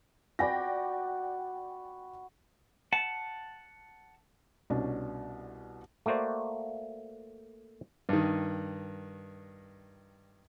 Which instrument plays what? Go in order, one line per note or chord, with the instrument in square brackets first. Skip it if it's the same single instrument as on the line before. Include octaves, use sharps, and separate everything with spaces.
[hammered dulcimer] F#4 B5 [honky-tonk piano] D5 G5 A#6
[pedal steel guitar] F#5 A5
[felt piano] C2 B2 C#4 D4
[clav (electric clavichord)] A3 A#3 F#4 C5 D5
[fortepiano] G2 D#3